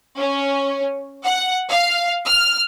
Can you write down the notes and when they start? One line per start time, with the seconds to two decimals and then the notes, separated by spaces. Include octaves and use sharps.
0.18 C#4
1.25 F#5
1.70 F5
2.25 F6